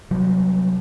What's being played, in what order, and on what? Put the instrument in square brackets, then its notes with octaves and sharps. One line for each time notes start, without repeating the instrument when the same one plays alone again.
[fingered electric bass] C3 F#3 G3